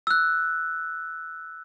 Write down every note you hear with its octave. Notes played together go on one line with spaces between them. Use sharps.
E6 F#6